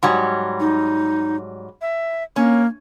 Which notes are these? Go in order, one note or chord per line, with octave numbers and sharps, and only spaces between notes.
G#2 F#3 G3
D#4
E5
A#3 C#4